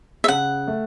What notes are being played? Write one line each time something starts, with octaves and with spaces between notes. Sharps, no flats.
E5
C#3 F#5
A3